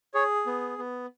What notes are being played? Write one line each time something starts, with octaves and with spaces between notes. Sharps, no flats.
G#4 C#5
B3
B3